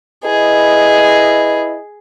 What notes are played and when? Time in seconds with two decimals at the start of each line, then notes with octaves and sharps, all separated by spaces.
0.25 E4 G#4 B4 D#5